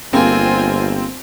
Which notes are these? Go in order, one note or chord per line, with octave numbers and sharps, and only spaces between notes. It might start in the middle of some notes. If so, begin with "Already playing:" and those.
G1 A#3 C4 F4 G4 G#4 C5 G#5